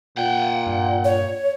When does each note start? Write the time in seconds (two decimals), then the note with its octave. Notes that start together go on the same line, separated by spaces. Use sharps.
0.17 A#2 F#5 G5
0.67 G2
1.04 C#5